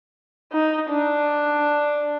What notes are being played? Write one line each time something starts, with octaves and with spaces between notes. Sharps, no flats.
D#4
D4